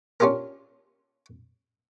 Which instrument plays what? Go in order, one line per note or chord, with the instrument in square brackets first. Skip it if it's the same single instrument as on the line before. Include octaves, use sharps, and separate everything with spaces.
[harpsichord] C#4 D4 F4 G4 A#4